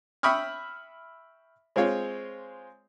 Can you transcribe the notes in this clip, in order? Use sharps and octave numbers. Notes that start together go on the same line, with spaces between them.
E5 G5 B5 C#6 D#6 F6
G#3 C4 F4 C#5